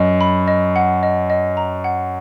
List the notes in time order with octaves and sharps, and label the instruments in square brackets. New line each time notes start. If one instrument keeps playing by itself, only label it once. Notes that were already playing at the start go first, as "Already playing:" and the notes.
Already playing: [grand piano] F#2 [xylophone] D#5
[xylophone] B5
D#5
F#5
D#5
D#5
A#5
F#5